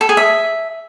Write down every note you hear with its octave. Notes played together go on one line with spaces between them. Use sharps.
A4
G#4
E5